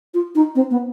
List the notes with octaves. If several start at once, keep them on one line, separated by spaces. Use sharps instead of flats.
F4
D#4
C4
B3